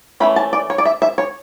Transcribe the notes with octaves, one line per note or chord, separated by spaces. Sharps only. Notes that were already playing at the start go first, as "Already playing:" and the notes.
E3 A3 C#4 B5
A5
D5
C#5
D5
E5
E5
C#5